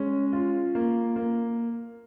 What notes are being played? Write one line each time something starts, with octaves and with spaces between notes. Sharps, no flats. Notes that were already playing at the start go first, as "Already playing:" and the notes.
Already playing: G#3 C#4
F4
A#3
A#3